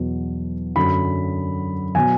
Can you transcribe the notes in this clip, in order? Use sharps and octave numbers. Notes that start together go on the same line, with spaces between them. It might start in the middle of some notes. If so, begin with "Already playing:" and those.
Already playing: E2 B2 F#3
F#2 D3 F#3 B5
B2 F#3 G#5